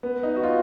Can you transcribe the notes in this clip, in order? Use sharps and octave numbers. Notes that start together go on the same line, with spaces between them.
B3
D#4
F#4
F4